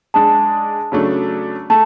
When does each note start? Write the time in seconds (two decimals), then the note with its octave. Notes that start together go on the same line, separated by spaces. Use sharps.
0.14 G#3 D4 G#4 A5
0.92 C#3 F#3 A3 D4
1.70 A3 A5